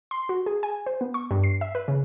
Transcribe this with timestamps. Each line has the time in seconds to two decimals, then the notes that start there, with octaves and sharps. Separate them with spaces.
0.11 C6
0.29 F#4
0.46 G#4
0.63 G#5
0.86 C5
1.01 B3
1.14 C#6
1.31 G2
1.44 C7
1.61 E5
1.75 B4
1.88 C#3